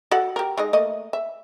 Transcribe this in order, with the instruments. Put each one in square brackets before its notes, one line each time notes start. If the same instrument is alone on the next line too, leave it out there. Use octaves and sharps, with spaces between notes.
[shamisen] F#4 A4 F#5
G4 A#4
G#3 D#4 D#5
A3 A#3 D#5
E5